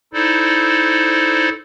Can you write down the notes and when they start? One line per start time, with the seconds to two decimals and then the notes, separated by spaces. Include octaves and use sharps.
0.13 D#4 E4 A4 C5 D5